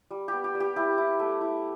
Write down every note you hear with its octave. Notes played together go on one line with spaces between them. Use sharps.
G3
B3 G4
G4
G3
G4
E4 G4
E4
A3
E4